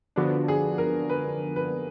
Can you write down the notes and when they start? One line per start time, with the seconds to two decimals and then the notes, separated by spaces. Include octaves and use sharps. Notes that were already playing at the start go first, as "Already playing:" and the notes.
0.16 D3 F3 B3 D4 F#4
0.48 G#4
0.78 A#4
1.09 B4
1.56 B4